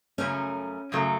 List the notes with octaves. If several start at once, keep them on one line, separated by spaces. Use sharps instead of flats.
F#2 C#3 F#3 A3 C#4
F#2 C#3 F#3 A3